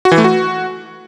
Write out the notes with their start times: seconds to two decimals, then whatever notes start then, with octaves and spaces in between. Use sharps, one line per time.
0.05 F#4
0.12 E3
0.18 A3
0.24 F#4